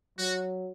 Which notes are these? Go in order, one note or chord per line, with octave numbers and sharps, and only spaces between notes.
F#3 F#4